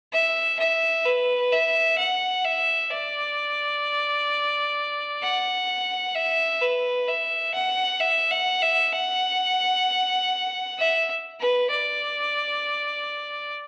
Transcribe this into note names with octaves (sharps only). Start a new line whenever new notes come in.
E5
E5
B4
E5
F#5
E5
D5
F#5
E5
B4
E5
F#5
E5
F#5
E5
F#5
E5
B4
D5